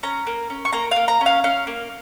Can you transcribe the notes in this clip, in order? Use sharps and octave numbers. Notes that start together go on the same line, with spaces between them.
C#4 A#5
A#3
C#4
C#6
A#3 A#5
A#3 F5
A#5
C#4
F5
C#4 F5
A#3